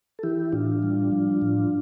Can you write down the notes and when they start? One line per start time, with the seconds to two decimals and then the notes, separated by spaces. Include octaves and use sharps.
0.19 A4
0.23 E3 E4 G4
0.52 A2 D4 F4
0.83 G3
1.12 F3
1.41 A2